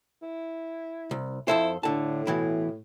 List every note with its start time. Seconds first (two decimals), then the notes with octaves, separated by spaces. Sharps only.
0.22 E4
1.11 C2
1.48 F2 E4 A4 C5
1.83 A2 D3 A5
2.27 B2 E3 E4